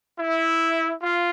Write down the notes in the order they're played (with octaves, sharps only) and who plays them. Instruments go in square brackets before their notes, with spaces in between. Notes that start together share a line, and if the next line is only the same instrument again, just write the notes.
[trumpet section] E4
F4